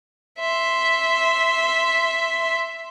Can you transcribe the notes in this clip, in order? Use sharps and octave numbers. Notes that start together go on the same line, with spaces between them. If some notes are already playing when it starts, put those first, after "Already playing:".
E5 C6